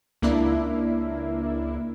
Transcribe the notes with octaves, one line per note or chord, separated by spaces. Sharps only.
C#2 A#3 D4 E4